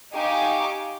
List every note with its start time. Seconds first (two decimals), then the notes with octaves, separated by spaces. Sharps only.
0.14 D#4 G4 F5 G#5 C#6 D6